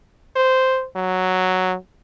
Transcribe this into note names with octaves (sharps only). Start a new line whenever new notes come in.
C5
F#3